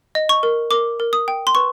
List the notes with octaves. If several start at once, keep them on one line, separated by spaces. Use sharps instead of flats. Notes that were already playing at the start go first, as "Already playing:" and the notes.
D#5
C#6
A#4
A#4 D6
A#4
D#6
G5
C6
B4 C#6